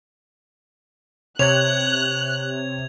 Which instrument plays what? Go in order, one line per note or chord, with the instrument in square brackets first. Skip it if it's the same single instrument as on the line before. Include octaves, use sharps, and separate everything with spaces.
[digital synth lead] C3 [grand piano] C#5 [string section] F#6 [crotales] G#6 F7